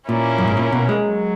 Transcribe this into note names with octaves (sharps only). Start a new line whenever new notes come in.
A#2 A#3 C#4 E4 A#4
F#2
G#2
A#2
B2
G#3
F#3